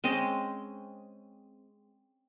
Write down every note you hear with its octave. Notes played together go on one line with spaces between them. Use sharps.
G#3 C4 C#4 D#5